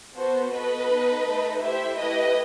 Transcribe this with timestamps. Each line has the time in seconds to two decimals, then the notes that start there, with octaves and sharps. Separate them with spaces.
0.15 B3 F#4 A4 C5
0.52 B3 F#4 A4 B4 D#5
0.89 B3 D#4 A4
1.26 A3 D#4 A4
1.61 A3 E4 G4 C5 E5
1.98 A3 E4 G4 B4 D#5